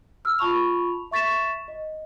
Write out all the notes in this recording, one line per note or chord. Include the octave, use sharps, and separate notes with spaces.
E6 F6
F4 A5 B5 C#6 F7
E5 C#6 A6 B6 E7
D#5